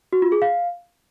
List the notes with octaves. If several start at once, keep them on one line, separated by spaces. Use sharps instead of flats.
F#4
F4
G#4
F5